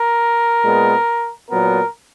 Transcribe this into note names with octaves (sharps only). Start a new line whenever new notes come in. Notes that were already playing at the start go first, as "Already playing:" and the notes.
Already playing: A#4
A#2 G#3 B3
A#2 F#3 B3 A#4